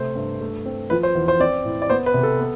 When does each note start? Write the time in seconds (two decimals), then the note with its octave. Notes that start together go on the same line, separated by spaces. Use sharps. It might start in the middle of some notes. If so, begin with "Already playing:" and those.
Already playing: C3 A3 C5
0.16 G2
0.41 A3
0.65 C4
0.90 F3 B4
1.03 C5
1.15 E2
1.28 C5
1.40 C4 D5
1.65 A2
1.82 D5
1.90 B3 C5
2.06 B4
2.14 C3
2.23 A4
2.40 B3